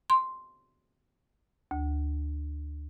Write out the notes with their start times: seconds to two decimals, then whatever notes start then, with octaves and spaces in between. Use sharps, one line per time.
0.10 C6
1.71 D2